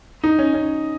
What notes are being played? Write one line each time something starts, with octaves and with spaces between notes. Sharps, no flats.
D#4
C#4
C#4